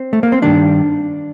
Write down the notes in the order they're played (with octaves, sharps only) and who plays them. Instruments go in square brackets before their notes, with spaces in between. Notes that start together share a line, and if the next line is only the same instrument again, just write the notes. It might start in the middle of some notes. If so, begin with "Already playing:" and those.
Already playing: [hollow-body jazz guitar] C4
A3
A#3
C4
G2 D#3 G3 D4